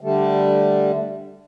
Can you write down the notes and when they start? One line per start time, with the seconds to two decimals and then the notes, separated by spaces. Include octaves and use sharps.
0.01 D3 G3 A3